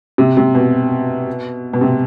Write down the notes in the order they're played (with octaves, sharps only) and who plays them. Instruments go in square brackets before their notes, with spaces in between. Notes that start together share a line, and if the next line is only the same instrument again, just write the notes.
[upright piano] C3
C3
B2
B2
C3